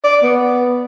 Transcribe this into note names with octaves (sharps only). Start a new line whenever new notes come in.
D5
B3